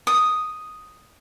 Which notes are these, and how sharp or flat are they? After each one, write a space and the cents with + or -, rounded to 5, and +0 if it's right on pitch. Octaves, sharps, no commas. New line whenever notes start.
D#6 +0